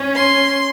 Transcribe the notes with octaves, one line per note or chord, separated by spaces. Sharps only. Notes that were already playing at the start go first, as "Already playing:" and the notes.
Already playing: C#4
C6